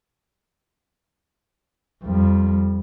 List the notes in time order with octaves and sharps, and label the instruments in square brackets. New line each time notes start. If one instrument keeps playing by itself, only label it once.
[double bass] F2 G3